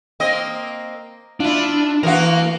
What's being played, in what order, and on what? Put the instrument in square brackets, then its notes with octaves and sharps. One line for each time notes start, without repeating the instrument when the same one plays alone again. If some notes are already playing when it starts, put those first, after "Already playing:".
[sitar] A#3 C4 D#5
[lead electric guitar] D4 [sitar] E4 F4
[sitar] E3 F#4 [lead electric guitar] A#4 F5